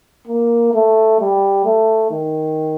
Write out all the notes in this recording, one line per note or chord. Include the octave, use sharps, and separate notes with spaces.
A#3
A3
G3
A3
D#3